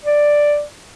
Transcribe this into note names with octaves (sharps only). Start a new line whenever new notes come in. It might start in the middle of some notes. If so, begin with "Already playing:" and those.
D5